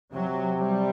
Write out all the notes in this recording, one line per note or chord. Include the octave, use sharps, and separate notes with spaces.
C3 F#3
G3